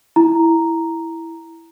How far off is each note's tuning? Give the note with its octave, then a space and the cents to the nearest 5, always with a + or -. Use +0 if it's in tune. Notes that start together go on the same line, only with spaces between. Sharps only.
E4 +0 A#5 +0